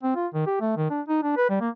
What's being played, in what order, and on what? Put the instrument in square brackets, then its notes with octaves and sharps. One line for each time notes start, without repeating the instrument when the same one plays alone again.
[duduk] C4
F4
D#3
G4
A3
D#3
D4
D#4
D4
B4
G3
A#3